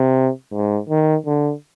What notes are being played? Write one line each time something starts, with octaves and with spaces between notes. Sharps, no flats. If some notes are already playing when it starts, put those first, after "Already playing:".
Already playing: C3
G#2
D#3
D3